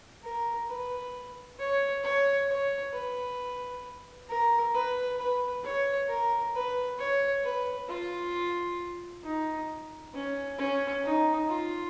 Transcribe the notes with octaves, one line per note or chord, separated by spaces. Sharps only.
A#4
B4
C#5
C#5
C#5
B4
A#4
B4
B4
C#5
A#4
B4
C#5
B4
F4
D#4
C#4
C#4
D#4
F4